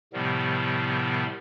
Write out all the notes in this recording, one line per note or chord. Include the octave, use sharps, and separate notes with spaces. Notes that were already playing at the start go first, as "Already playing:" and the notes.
A2 C3 D#3 F3 G3 B3